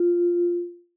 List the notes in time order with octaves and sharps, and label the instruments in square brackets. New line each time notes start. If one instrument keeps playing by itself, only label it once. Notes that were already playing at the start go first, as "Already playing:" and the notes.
Already playing: [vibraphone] F4